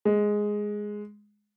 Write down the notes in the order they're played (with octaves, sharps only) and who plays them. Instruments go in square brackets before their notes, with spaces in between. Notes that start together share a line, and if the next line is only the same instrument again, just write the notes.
[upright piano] G#3